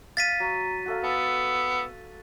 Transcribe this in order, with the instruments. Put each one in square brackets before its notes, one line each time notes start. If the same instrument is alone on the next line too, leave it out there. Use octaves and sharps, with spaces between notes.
[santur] F5 [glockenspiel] A6 B6 D#7
[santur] F#3
F#4 A4 F5
[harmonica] B3 E6 [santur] A5